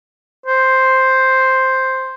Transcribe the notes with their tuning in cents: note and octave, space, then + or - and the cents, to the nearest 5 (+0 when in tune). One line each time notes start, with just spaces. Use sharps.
C5 +0